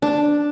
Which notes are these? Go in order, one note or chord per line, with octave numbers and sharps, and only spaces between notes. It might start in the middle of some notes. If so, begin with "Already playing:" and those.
D4